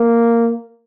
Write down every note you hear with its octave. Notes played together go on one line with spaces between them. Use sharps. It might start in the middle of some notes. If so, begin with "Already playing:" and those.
Already playing: A#3